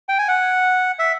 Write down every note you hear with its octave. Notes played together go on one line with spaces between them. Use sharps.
G5
G#5
F#5
E5